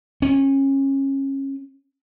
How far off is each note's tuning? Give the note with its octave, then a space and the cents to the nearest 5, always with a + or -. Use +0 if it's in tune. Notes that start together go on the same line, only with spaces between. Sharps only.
C#4 -25